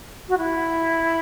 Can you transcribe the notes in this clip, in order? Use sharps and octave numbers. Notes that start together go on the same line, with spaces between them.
F#4
E4